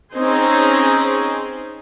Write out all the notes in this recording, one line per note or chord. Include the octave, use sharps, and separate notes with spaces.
C4 C#4 D#4 G#4 C5